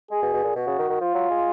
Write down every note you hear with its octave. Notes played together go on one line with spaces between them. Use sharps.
G#3 G#4
B2
B2
A#2
B2 F#4
C#3
D#3
D#3
F3 F4
F#3
G#3